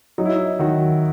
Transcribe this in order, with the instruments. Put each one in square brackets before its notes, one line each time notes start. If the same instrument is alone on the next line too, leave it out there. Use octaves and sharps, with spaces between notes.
[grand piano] F#3 [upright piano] D#4
[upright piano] E4
D#4
[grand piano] D#3 [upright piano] F#4